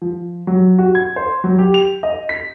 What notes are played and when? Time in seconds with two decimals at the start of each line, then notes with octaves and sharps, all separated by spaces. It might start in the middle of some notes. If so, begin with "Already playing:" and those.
0.02 F3
0.47 F#3
0.78 F#4
0.95 G#6
1.16 C5
1.44 F#3
1.58 G4
1.74 F7
2.03 D#5
2.29 B6